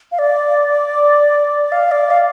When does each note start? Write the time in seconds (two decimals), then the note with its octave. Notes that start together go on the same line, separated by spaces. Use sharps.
0.12 F5
0.19 D5
1.72 F5
1.91 D5
2.11 F5